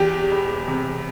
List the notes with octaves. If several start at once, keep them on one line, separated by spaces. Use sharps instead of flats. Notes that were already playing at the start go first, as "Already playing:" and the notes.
Already playing: E2 G4
E1
C3